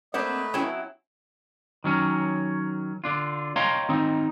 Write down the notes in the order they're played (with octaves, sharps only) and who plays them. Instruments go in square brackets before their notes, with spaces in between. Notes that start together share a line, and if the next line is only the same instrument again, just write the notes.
[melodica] A3 B4 [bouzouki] A#3 C4 D4 [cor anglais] D#5 [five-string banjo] F#5
[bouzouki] F#3 E4 [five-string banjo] C4 C#4
[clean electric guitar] D#3 F#3 C#4
D3 D4 F4
C#5 D#5 F5 G5 A#5 C6
D#3 C4 D#4